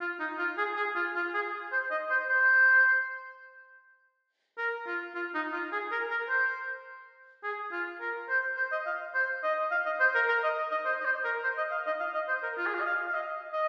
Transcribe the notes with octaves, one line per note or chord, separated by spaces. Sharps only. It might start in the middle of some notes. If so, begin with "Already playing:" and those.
F4
D#4
F4
G#4
G#4
F4
F4
G#4
C5
D#5
C5
C5
A#4
F4
F4
D#4
F4
G#4
A#4
A#4
C5
G#4
F4
A#4
C5
C5
D#5
F5
C5
D#5
F5
D#5
C5
A#4
A#4
D#5
D#5
C5
D#5
C5
A#4
C5
D#5
F5
D#5
F5
D#5
C5
A#4
F4
G#4
F4
D#5
F5
F5
D#5
D#5